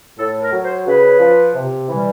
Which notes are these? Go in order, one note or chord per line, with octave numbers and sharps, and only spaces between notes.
A2 A4
A#4
F#3
C5
C#3 B4
F3
C3
E3 G3